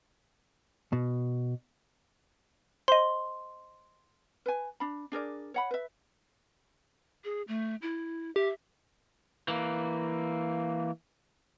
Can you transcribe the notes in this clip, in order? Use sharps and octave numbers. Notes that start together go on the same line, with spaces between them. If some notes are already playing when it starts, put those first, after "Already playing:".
B2
C5 D#5 C6
B4 G#5
D4 B5
D4 G#4 A#4 D5
C#5 F#5 B5
B4 E5
G#4
A3
E4
G4 E5
E3 A#3